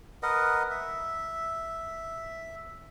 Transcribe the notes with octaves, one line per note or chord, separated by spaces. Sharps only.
A#4 B4 D#5 F#5
E5